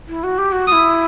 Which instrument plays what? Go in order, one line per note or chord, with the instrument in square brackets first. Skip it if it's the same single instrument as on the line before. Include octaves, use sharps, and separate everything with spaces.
[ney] E4
F#4
G4
F#4
[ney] F#4 [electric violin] D#6
[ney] E4